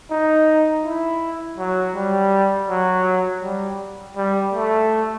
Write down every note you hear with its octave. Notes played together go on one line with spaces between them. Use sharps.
D#4
E4
F#3
G3
F#3
G3
G3
A3